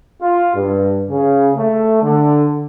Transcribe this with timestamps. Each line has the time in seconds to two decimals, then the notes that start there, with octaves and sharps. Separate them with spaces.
0.22 F4
0.56 G2
1.10 C#3
1.57 A3
2.03 D3